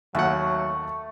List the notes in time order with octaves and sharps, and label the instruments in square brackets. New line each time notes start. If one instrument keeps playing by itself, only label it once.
[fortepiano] D#2 F#5 [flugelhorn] F#3 [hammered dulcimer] A3